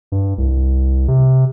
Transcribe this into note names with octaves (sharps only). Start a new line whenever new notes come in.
G2
C2
C3